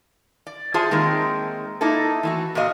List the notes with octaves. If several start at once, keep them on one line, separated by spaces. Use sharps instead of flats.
D5
F4 G#4 C5 E5 F#5 A5
D#3 G#3 A#3 C4
A#3 D#4 E4 A4
E3 A3 F#4
A#2 A3 F#4 D#5 F5